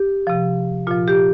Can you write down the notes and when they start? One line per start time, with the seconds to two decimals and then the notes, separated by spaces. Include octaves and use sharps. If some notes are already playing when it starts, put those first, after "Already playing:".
Already playing: G4
0.27 C3 F3
0.87 A#2 F3 F4
1.08 G4